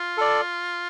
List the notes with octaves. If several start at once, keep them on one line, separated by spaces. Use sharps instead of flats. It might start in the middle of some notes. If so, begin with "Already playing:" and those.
Already playing: F4
A4 D5